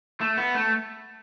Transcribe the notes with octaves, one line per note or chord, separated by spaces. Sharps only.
A3
B3
A3